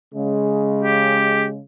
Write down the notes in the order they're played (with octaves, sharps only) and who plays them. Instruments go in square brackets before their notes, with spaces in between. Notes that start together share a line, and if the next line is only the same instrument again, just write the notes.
[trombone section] C#3 G#3
[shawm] G4